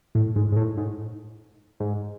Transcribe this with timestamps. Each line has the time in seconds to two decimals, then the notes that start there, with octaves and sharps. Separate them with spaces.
0.15 A2
0.36 G#2
0.52 G#2
0.56 A2
0.77 G#2
1.80 G#2